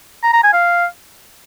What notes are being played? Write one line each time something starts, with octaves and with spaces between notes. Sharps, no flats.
A#5
A#5
G#5
F5